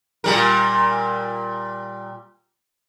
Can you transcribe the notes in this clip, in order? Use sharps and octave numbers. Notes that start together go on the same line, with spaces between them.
A#2 G3 A#4